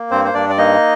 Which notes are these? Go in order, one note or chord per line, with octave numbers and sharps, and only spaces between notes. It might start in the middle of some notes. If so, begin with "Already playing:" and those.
Already playing: A#3
G2 C4 C5
C5
G2 D4 D5
D5
A#3 D#4 D#5